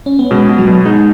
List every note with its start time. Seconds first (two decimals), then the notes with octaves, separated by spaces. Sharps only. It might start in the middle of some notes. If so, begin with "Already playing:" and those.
0.06 C#4
0.19 B3
0.31 B2 G#3
0.49 B2
0.58 F#3
0.67 B2
0.85 G#3 D#4